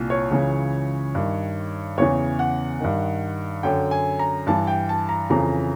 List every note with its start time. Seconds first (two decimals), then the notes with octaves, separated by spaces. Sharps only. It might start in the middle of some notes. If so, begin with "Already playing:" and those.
Already playing: C2 A#2
0.10 C#5
0.31 C#2 C#3 E3
1.15 G2 D#3
1.97 E2 C#3 E3 C#5
2.39 F#5
2.80 G2 D#3
3.63 F#2 D3 G5
3.91 G#5
4.19 A#5
4.47 G2 E3 A5
4.67 G5
4.89 A5
5.09 A#5
5.30 F2 C#3 E3 A#5